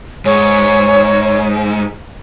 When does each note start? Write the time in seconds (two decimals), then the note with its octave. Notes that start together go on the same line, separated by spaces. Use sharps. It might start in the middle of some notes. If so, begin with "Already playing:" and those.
0.25 G#2 C#5